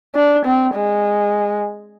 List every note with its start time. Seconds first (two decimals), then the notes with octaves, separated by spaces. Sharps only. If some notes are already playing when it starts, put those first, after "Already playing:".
0.15 D4
0.45 C4
0.75 G#3